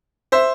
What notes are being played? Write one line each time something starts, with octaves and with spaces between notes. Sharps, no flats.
C5 E5